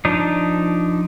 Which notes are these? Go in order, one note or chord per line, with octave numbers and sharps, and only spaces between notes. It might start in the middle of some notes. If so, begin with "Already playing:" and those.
F3 D4 D#4